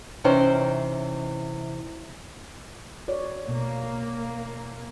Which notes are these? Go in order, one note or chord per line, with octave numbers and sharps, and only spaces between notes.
C3 E3 C#4 D#4 C5 G5
F#4 C#5 D5
B2 A#3